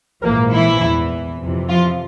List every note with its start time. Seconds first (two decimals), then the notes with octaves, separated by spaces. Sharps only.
0.23 A#1 G#2 E3 A#3 A#4
0.52 E3 E4
0.82 E2 E3
1.41 F2 C3 E3
1.69 F3 F4